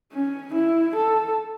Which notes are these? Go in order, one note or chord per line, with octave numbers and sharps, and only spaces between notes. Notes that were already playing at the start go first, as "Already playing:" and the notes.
C#4
E4
A4